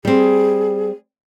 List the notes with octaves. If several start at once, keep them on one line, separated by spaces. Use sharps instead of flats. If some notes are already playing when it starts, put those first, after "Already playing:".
G3 C4 G#4